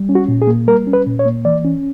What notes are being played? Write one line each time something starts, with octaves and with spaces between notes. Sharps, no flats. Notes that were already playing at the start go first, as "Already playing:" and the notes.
Already playing: G3
C#4
F#4
A#2
G#4
A#3
G3 A#4
C#4
B4
A#2
C#5
A#3
E3 D5
C#4